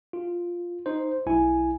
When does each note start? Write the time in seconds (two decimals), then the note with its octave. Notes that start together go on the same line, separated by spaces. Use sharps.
0.13 F4
0.86 D#4 C5
1.26 B1 E4 G#5